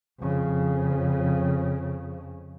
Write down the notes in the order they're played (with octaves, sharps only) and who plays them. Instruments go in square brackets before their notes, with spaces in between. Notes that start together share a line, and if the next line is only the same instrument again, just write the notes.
[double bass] F2 C#3